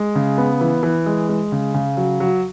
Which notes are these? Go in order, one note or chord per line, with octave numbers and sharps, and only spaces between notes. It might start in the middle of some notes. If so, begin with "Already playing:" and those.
Already playing: G#3
C#3
B3
E3
E3
G#3
G#3
C#3
C#3
F#3
F#3